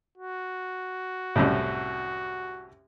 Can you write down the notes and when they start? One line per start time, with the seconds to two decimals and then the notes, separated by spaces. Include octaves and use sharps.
0.18 F#4
1.36 C2 F#2 A2